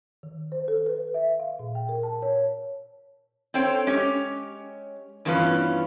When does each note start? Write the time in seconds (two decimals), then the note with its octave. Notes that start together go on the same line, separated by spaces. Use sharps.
0.23 D#3
0.52 C5
0.68 A4
0.86 B4
1.14 E5
1.40 F5
1.59 A#2
1.75 G5
1.89 A#4
2.03 A5
2.22 C#5
3.54 C4 A4 C5 C#5 G5
3.87 G#3 C#4 G4 C#5
5.25 G2 E3 B3 C#4 F4 B4